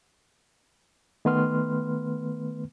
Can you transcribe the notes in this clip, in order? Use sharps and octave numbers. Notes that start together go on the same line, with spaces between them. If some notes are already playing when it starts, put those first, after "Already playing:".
D#3 A3 B3 B4 C6 F6